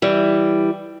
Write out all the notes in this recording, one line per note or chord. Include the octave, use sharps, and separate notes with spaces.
E3 G3